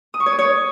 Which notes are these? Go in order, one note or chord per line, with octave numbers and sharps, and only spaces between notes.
D#6
C#6
C#5
D#6
C#5